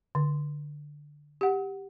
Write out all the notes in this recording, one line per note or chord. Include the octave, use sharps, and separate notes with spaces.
D3
G4 F#5